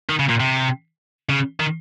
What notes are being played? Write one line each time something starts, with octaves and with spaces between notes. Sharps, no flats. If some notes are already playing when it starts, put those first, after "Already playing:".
D#3
C#3
A#2
C3
C#3
D#3